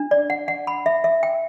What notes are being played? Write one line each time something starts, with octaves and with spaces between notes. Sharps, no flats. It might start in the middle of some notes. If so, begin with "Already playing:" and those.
Already playing: D4
D5
F#5
F#5
B5
E5
E5
G5